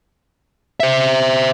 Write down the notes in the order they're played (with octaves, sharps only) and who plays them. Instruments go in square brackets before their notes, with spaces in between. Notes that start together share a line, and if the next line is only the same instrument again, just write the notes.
[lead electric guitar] C5 E5